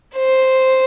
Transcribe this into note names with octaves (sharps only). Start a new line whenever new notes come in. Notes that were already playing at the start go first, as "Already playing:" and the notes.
C5